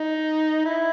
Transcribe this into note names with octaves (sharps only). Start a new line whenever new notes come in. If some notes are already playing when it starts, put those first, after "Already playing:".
Already playing: D#4
E4